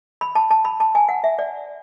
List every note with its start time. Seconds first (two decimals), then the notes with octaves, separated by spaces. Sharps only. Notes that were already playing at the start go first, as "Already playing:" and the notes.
0.21 B5
0.35 A5
0.51 A5
0.65 B5
0.80 A5
0.95 G#5
1.09 F#5
1.24 E5
1.39 D5